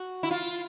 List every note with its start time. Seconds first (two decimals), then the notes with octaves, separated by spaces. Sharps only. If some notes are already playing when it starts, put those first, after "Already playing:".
Already playing: F#4
0.23 E4
0.31 F4